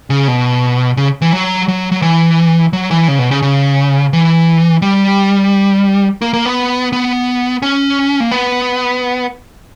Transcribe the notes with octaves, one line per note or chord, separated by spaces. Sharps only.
C#3
B2
C#3
E3
F#3
F#3
F#3
E3
F#3
E3
C#3
B2
C#3
C#3
E3
G3
A#3
A#3
B3
B3
C#4
A#3
B3